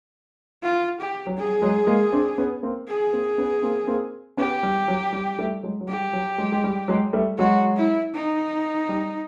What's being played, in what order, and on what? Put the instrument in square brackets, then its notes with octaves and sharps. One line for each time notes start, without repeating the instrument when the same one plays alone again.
[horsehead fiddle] F4
G4
[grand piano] F#3
[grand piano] G3 [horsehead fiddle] G#4
[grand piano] F#3 G#3
G#3 A#3
C4 D4
B3 C#4
A#3 C4
[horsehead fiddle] G#4
[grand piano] A#3 C4
B3 C#4
A#3 C4
A#3 C4
[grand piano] B3 C#4 [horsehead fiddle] G4
[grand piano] G3
F#3
G3
G3 A3
F#3 G#3
F#3
[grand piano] G3 [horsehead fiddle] G4
[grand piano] F#3
F#3 G#3
G#3
G3
F#3 G#3
G3 A3
[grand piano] F#3 G#3 [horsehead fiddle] F#4
[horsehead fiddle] E4
D#4
[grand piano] G3